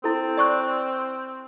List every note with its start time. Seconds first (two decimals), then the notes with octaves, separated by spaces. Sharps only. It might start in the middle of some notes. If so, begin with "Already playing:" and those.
0.04 C4 E4 A4
0.38 D5 C#6 F#6